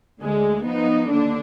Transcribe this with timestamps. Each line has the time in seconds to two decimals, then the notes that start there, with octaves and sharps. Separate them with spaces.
0.21 D2 D3 G#3
0.66 F3 B3 D#4
1.11 D#2 D3 D4